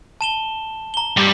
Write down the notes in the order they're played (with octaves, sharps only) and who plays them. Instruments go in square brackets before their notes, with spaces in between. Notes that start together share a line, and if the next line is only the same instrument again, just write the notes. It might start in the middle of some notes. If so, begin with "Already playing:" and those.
[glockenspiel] A5 E7 G7
A#5 G7
[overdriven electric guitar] G2 G3